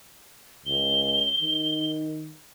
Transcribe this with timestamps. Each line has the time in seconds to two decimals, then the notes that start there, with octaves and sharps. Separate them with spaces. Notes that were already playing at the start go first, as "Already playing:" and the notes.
0.66 C#2 G7
1.42 D#3